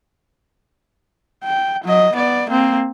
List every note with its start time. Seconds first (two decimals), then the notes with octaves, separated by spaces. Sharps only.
1.44 G5
1.85 F#3 D#5
2.14 B3 D5
2.49 A#3 C4